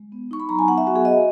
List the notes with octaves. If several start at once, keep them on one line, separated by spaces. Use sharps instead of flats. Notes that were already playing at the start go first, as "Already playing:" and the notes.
Already playing: G#3
B3
D#4 C#6
B5
F#3 A#5
G#5
B3 F#5
E5
B3 F#4
G#4
F#4 D#5